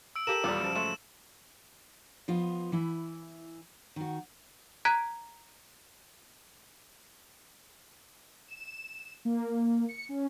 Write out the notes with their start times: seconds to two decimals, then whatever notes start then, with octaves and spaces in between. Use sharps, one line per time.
0.16 E6 D7
0.27 G4 A4 A#4 E7
0.44 D#1 E2 G3 F4 D6
0.60 F#2 C#3 F3
0.76 G#3 A3 E7
2.28 F3 B3 F4 D#5
2.72 E3 E4
3.96 D#3 F#4
4.85 A#5 F#6 G#6 B6 D7
8.48 E7
9.25 A#3
9.89 C#7
10.09 C#4